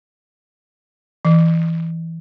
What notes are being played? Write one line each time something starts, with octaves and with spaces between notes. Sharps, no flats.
E3